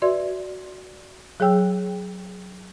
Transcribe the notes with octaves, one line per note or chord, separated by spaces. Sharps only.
F#4 B4 D5 E5 C6 G#6
F#3 G#4 C#5 G5 E6